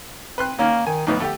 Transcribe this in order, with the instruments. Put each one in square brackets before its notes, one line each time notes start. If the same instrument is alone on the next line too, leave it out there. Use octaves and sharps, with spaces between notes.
[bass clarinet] C4 [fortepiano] B4 C6 F#6
[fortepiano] D#3 C#4 [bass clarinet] A#3
[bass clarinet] D#3 [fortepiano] G#5
[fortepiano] F2 A2 B3 [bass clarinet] D#4
[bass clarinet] D3 [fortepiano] A3 G4